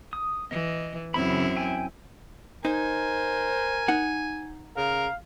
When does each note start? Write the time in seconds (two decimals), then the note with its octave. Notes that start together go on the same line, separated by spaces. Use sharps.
0.13 D#6
0.51 E3 D#5
1.14 F#2 C#3 C4 E4 B5
1.56 G5 G#5 E6
2.65 D#4 A#4 C5 G#5
3.88 D#4 F#5
4.77 C#3 A#4 F5